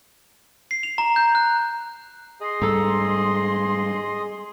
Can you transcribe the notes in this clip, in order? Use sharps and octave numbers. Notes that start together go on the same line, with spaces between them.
C7
F7
A#5
G6
F#6
G#4 D#5 C6
G#2 G3 A4 A#5